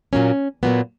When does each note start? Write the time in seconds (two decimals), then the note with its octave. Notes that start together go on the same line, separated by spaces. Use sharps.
0.13 A#2 F#3 A#3 C#4
0.63 A#2 F#3 A#3 B3